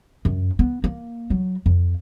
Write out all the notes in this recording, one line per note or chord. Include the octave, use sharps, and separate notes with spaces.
F#2
B3
A#3
F#3
F2